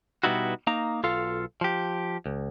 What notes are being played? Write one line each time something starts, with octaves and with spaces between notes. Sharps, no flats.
B2 G3 B3 D#4 E4 F#4
A#3 D#4 A#5
B1 F4 A4 F5
F3 G4
C#2